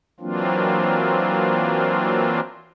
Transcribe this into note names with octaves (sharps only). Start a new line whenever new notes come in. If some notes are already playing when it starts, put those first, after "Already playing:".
E3 F#3 A#3 C4 D4 F4